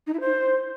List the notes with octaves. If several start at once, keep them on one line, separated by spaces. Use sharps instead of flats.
D#4
E4
C5